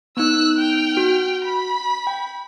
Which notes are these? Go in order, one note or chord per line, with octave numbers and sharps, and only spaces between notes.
B3 D#4 E6 F#6
G5 F6
F#4
B5
G5